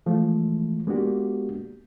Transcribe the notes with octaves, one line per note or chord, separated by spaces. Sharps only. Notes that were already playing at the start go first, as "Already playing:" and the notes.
E3 F3 G#3 A3
G#3 A#3 B3 D4 F#4 G4